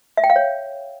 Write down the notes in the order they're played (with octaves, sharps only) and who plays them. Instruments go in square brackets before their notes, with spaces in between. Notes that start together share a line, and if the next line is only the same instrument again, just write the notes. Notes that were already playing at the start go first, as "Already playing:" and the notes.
[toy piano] E5
G5
F5
C#5